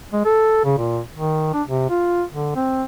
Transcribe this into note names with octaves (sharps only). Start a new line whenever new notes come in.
G#3
A4
C#3
A#2
D#3
D4
C3
F4
D3
C4